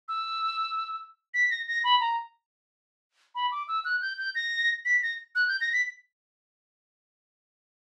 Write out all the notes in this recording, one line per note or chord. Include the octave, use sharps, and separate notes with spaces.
E6
B6
A#6
A#6
B5
A#5
B5
D6
E6
F#6
G6
G6
A#6
B6
A#6
F#6
G6
A#6
B6